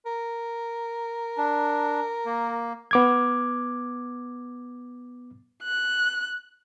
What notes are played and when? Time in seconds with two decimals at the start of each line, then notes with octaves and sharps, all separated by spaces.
0.06 A#4
1.37 D4
2.26 A#3
2.91 B3 D6 G#6
5.63 F#6